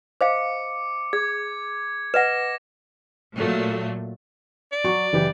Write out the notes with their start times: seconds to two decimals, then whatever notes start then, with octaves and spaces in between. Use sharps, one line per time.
0.21 C5 D#5 F5 D6 C#7
1.13 G#4 G#6
2.14 B4 D#5 F#5 A#6 E7
3.35 A#2 F#3 A3
4.72 D5
4.84 F#3 F#4 C#6
5.13 F#1 E3 G4